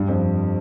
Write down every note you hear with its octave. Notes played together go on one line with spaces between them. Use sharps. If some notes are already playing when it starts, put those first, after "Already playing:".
Already playing: G2
F2